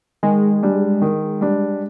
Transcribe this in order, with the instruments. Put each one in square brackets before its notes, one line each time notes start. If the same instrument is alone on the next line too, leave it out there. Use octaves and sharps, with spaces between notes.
[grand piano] D#3 [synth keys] G#3
[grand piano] G3 D4
D#3
G3 D4